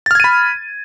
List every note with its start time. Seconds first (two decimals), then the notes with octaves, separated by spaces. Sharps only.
0.06 A6
0.11 F6
0.15 G#6
0.20 D#7
0.24 B5